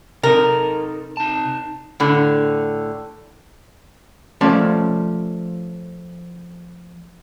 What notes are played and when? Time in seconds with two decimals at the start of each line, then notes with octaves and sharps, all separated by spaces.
0.23 C3 D#4 A4 A#4
1.17 D#4 A5
2.00 A2 D3
4.41 F3 A3 C#4 D5 F5 A5